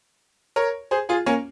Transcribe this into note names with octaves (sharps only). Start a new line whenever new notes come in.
A#4 C#5
G#4 C5
F4 G#4
A#3 C#4